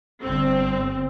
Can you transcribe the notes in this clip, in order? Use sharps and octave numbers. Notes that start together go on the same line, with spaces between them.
G1 C4